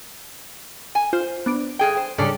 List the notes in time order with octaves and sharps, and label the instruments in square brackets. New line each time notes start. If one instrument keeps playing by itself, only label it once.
[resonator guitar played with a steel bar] G#5
[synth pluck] F4 [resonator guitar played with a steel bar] C5
[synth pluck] B3 D4 D7
[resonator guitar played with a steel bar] G2 G#4 G5
C5
[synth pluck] G#2 C#3 G3 [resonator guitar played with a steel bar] C#4 D4 A4